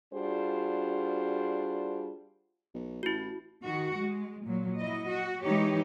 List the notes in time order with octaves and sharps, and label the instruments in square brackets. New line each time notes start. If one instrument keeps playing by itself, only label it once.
[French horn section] G3 D4 F4 F#4 G#4 C5
[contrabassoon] B1
[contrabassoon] A1 [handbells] E4 F#4
[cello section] D#3 F#4
G#3
A#2 F#3
F#3 E4 D#5
F#4
E3 G#3 D#4 G4 C#5